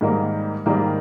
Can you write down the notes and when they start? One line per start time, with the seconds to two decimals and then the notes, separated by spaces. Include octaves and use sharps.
0.01 G#2 D#3 G3 A#3
0.66 G#2 D#3 G3 A#3